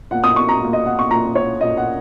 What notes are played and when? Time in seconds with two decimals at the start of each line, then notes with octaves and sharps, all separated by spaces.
0.11 A#2 A#3 F#5
0.24 D#6
0.36 C#6
0.49 A#5
0.61 A#2 A#3
0.73 D#5
0.86 F#5
0.99 C#6
1.10 A#2 A#3 A#5
1.35 C#5
1.61 A#2 A#3 D#5
1.77 F#5